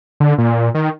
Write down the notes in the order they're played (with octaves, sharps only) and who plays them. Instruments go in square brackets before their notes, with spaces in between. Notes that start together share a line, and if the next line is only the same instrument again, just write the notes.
[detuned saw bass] D3
A#2
D#3